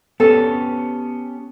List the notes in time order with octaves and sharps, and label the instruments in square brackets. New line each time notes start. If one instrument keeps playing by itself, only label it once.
[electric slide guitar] B3 C#4 G4 [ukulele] A4